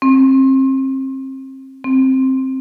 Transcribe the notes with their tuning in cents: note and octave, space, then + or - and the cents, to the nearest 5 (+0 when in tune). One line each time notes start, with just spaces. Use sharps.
C4 +30
C4 +10